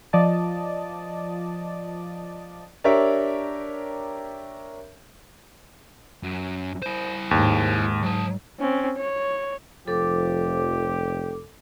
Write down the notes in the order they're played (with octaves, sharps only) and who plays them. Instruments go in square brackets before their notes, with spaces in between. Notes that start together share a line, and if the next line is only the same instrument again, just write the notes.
[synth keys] F3 D5 D#5 A5
[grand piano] D4 G4 A#4 C#5 E5
[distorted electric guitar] F#2
E4 C5
[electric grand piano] D#2 [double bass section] G#2
[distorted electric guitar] F#3 A5
[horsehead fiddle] C4 C#4
C#5
[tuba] F1 [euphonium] F3 [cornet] G4 [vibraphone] A4 D6